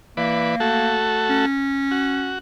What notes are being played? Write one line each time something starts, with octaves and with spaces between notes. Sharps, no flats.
E3 A#3 B4 D5
A3 F#4 A4
C#4
F#4